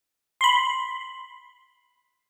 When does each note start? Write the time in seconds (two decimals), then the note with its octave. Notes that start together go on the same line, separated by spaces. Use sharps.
0.41 B5 C6